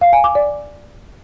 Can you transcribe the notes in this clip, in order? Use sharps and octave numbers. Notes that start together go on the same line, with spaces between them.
F5
G#5
D6
D5